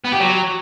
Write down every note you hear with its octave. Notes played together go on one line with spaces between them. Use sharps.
B3
G4
F#3